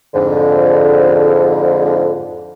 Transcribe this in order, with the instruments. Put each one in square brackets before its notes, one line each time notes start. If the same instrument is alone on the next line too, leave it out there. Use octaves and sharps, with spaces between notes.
[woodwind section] F2 G#2 D3